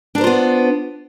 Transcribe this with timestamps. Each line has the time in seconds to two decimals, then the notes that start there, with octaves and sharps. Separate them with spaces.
0.15 D4
0.18 A#4
0.21 C5
0.24 F4
0.27 B3